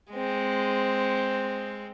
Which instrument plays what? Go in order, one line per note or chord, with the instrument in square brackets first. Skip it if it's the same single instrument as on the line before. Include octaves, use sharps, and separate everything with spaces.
[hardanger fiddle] G#3 C4